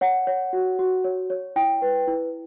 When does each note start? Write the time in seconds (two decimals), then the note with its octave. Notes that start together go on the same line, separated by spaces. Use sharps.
0.01 C#5 F#5
0.27 C#5
0.53 F#4
0.79 F#4
1.04 C#5
1.30 C#5
1.56 E4 G5
1.82 B4
2.08 E4